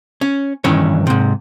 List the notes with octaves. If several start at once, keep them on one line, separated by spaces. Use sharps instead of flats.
C#4
G2 D#3 E3 C#4 C#5
G#2 C3